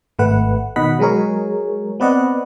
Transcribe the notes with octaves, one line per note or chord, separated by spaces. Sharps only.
G#1 A3 B4 F#5
B2 D#3 D#5 F#5 B5 B6
F#3 G#3 G#4 A#4 C#5
B3 C4 B4 D5 D#5 F#5